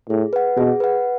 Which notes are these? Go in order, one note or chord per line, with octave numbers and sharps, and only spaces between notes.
A2 G#4
B4 F#5
B2 G#4
B4 F#5